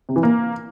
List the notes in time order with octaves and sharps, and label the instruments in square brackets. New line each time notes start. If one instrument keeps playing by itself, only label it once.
[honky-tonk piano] C3
E3
A#3